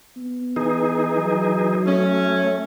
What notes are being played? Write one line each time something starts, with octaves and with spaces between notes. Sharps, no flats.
B3
E3 D#4 G#4
F#3
A3 C#4